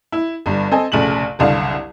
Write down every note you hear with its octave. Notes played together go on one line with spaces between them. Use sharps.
E4
G1 G2
C4 A4 D#5 G#5
F1 A#1 C#3 A3 F#7
F#1 C2 D3 F5